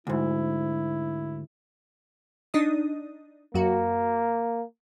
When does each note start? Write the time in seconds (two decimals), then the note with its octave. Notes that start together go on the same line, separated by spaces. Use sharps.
0.07 D2 G#2 E4
2.54 D4 D#4 D#6
3.54 F#2 A#3 F#4